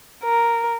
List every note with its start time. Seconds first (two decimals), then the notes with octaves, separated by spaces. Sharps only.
0.23 A#4